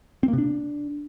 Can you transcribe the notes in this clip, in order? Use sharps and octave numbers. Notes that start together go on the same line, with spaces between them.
C4
A#3
C3
D4